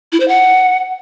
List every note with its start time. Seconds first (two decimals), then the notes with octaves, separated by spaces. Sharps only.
0.12 E4
0.20 C5
0.28 F#5